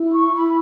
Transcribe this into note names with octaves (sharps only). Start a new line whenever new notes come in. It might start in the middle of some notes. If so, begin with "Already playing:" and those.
Already playing: E4
C#6
E4 B5